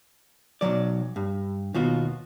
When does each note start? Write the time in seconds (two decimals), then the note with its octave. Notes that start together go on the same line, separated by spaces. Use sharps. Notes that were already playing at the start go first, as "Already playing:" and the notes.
0.61 B1 B2 F#3 D5
1.16 G2
1.74 D#2 B2 F4 F#4